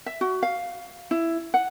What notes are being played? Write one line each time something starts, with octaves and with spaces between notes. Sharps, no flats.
E5
F#4
F5
E4
F#5